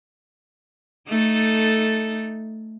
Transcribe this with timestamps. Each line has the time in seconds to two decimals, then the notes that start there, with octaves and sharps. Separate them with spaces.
1.08 A3 D#4 A4